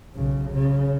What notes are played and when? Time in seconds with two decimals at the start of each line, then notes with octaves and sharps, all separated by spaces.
0.15 B1 C#3
0.51 C#3